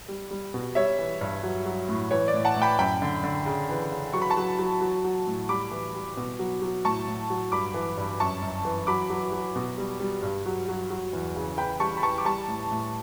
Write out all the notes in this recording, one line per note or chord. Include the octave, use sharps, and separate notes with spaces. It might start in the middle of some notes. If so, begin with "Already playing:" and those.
G3
G3
B2
G3 C#5 E5
E3
G2
F#3
F#3
A2
E3 C#5
D5
A2
F#5 A5
A2
G5 B5
F#2 G5 B5
D3
D3
C#3
E3
C#3
F#3 C#6
B5
A5 C#6
F#3
F#3
F#3
F#3
A2
G3 B5 D6
E3
G3
B2
F#3
F#3
A2 A5 C#6
A2
F#3
G2 B5 D6
E3
G2
F#2 A5 C#6
F#2
E3
F#3 B5 D6
F#3
F#3
B2
G3
G3
G2
F#3
F#3
F#3
E2
C#3
E3 G5 B5
G3 A5 C#6
B5
E3 A5 C#6
D6
G3 A5 C#6
A2
A2